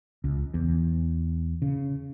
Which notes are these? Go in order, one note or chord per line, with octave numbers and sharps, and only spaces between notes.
C#2
E2
C#3